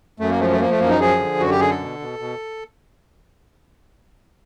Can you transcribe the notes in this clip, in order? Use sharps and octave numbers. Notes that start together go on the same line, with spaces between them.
F#2 A3
A#3
F3 A3
A3
F3 A#3
A3
F#2 A#3
D#4
F3 G#4
D3
F#2 F#4
G4
D3 G#4
A4
B2
B2
B2